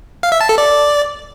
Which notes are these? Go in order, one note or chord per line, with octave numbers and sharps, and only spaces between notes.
F5
E5
A5
A4
D5